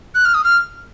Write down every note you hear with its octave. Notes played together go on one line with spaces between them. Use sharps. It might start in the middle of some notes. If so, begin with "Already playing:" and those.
F#6
F6
D#6
F6